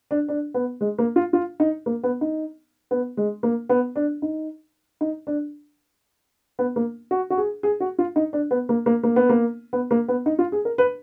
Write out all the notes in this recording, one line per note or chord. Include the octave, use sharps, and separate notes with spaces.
D4
D4
B3
G#3
A#3
F4
F4
D#4
A#3
B3
D#4
B3
G#3
A#3
B3
D4
D#4
D#4
D4
B3
A#3
F#4
F#4
G#4
G#4
F#4
F4
D#4
D4
B3
A#3
A#3
A#3
B3
A#3
B3
A#3
B3
D#4
F4
G#4
A#4
B4